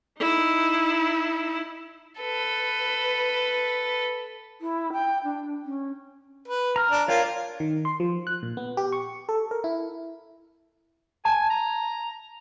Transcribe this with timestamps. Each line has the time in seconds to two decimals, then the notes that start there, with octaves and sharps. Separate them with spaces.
0.19 D#4 E4
2.21 A4 B4
4.61 E4
4.93 G5
5.24 D4
5.64 C#4
6.47 B4
6.76 A#5 F6
6.90 D4
7.08 F4 A#4 C#5 D5 G5
7.60 D#3
7.85 C6
8.00 F3
8.27 F#6
8.43 A#2
8.57 B3
8.77 G4
8.92 C#6
9.29 A4
9.51 A#4
9.64 E4
11.25 G#5 A5
11.50 A#5